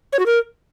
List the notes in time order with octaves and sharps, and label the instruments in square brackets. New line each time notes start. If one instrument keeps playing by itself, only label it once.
[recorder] C#5
F#4
A#4